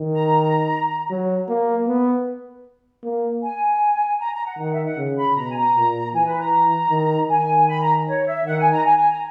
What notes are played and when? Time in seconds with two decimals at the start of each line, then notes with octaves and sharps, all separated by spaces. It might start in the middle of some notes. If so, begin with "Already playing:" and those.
Already playing: D#3
0.13 A#5
1.11 F#3
1.49 A#3
1.87 B3
3.04 A#3
3.42 G#5
4.19 A#5
4.33 A#5
4.45 F#5
4.59 D#3 F#5
4.72 E5
4.84 F#5
4.97 C#3
5.17 B5
5.36 B2 A#5
5.50 G#5
5.55 A#5
5.75 A#2
6.13 E3 G#5
6.26 B4
6.39 A#5
6.90 D#3
7.29 D#3 G#5
7.68 B5
7.81 A#5
8.07 C#5
8.26 E5
8.45 D#3 F#5
8.58 G#5
8.71 A#5
8.84 G#5
8.97 G#5
9.10 A#5